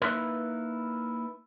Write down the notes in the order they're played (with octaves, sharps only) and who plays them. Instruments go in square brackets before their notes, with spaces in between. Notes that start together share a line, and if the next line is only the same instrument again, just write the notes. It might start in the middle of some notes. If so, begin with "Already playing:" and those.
[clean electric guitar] A#3 D#4 E4 A#4 B4